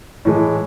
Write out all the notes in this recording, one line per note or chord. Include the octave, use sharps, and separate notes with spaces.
A2 E3 G#3